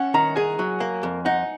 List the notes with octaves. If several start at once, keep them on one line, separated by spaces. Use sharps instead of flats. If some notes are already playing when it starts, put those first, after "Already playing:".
Already playing: C#4 F#5
D#3 A#5
G#4 G#5
F#3
A#3
F2
D#4 F#5